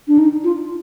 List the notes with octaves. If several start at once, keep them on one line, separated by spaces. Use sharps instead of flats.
D4
D#4
F4